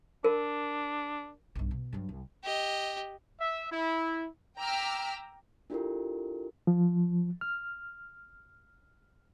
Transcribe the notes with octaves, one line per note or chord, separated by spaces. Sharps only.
D4 A#4
B1 G2
B2
G2 F#3
C2
G4 D#5
E5
E4
G5 A#5 D6 E6 F6 B6
D4 E4 F4 G4 A4 A#4
F3
F6